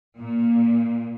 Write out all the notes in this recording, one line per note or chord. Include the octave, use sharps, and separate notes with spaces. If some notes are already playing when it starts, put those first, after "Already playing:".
A#2